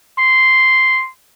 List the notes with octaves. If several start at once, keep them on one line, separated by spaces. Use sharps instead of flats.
C6